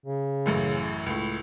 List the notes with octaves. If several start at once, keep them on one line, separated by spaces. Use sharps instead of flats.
C#3
A1 F#2 A2
C#2 A2